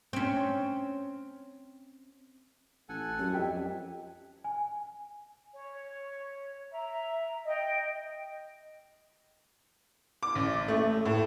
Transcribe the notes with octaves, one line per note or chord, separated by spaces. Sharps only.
C4 C#4
A1 A4 F#5 G#5
F#2 G4
F2 D#5 E5 G5
G#5
C#5
E5 A#5
D#5 G5
D6
A1
A3
A2